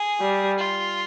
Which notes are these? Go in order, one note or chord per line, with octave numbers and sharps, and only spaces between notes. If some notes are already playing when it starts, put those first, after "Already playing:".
Already playing: G#4
G3
F4